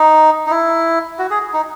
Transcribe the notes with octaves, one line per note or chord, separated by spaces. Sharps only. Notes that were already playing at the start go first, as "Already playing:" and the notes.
Already playing: D#4
D#4
E4
F#4
G#4
D#4